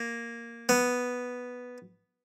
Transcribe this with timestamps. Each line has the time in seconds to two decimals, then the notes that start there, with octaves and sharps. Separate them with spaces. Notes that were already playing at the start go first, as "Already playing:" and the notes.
Already playing: A#3
0.69 B3